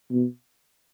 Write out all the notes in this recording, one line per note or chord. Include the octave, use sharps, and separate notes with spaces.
B2